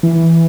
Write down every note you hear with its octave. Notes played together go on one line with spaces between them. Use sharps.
E3